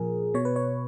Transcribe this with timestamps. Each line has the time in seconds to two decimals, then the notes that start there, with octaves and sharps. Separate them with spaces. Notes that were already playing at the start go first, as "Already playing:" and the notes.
Already playing: A#2 F3 G#4 A#4
0.34 B2 C#5
0.45 B4
0.56 C#5